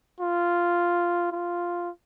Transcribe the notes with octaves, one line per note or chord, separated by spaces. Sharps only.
F4
F4